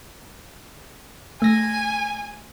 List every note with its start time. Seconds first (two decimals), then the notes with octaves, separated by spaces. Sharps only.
1.42 A3 G#5 A#6